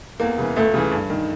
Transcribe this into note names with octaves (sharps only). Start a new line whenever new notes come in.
E2 A#3
C#3 E3
C#2 A3
C#3 E3
G2
D#3